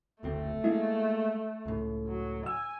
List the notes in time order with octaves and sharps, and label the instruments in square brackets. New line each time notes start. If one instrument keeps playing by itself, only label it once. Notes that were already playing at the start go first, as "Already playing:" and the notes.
[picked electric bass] F#1 D2 C4 [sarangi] A3
[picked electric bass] G#3 A#3 [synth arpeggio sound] E4
[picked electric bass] C#2 A2
[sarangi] F#3
[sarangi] G#5 [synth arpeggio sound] E6